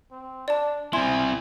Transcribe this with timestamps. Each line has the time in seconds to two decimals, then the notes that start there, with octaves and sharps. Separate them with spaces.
0.11 C4
0.48 D4 D5 A5
0.93 C4 E4 G#5 C6